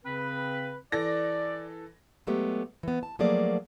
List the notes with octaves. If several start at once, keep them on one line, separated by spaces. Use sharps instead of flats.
C#3 C4 B4
E3 A4 D5 A#6
F#3 G#3 A3 B3 G4
E3 B3
A5
F3 F#3 A3 A#3 G#4 D5